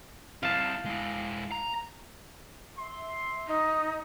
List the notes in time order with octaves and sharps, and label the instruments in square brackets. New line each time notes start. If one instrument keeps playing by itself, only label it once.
[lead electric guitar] C4 E4 [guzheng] F5 A5
[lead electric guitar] G#3 E4
A#5
[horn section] E5 C6
[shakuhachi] D#4